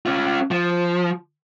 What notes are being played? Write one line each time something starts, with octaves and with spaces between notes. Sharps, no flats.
C#4 F4
F3